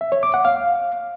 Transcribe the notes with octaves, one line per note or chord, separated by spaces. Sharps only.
E5
C#5
D6
F#5
F5